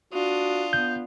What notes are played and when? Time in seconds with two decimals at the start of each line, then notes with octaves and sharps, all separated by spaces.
0.13 D4 F4 F#4 D#6
0.73 B3 G6